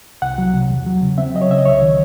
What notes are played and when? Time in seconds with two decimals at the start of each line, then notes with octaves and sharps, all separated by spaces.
0.22 C2 F#5
0.38 F#3
0.53 C3
0.70 E2
0.86 F#3
1.02 C#3
1.18 C4 E5
1.34 F#3 D#5
1.42 C#5
1.49 C#3 E5
1.58 D#5
1.65 C2 C#5
1.82 D#3